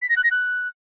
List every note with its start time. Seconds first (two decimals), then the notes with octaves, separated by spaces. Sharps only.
0.02 B6
0.09 A#6
0.17 F#6
0.24 A#6
0.31 F#6